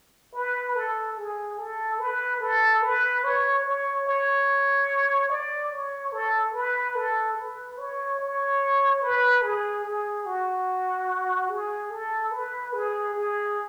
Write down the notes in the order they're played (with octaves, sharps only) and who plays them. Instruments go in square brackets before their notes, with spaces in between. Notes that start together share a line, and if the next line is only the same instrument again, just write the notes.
[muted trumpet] B4
A4
G#4
A4
B4
A4
B4
C#5
C#5
C#5
D5
C#5
A4
B4
A4
B4
C#5
C#5
B4
G#4
G#4
F#4
G#4
A4
B4
G#4
G#4